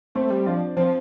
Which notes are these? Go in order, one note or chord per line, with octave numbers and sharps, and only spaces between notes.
A3 C4 C5
G3
F3 D4 D5
F3 C4 C5